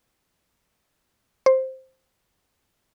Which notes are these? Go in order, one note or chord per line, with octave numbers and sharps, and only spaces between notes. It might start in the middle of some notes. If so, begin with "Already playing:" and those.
C5